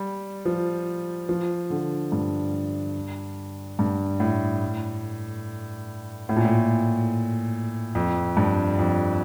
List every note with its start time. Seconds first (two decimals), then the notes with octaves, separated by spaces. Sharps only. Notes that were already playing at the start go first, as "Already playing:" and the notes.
Already playing: G3
0.45 F3
1.29 F3
1.70 D3
2.12 G2
3.79 G2
4.20 A2
6.29 A2
6.36 A#2
6.45 A2
7.95 F2
8.37 G2
8.79 F2